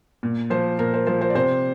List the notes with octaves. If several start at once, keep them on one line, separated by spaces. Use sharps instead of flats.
A#2
F3 C5
A#2 A#4
C5
F3 C5
C5
D5
C3 C5